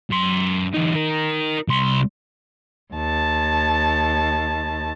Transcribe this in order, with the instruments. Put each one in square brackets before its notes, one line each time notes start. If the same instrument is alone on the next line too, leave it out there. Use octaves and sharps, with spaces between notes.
[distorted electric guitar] F#2 C6
E2 D#4
D#4 A#4
C2 C6
[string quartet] D#2 A5